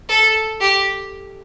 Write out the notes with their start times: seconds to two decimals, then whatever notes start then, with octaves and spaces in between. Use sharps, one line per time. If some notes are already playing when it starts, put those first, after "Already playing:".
0.09 A4
0.60 G4